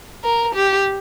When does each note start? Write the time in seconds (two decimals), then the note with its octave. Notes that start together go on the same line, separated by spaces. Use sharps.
0.24 A#4
0.55 G4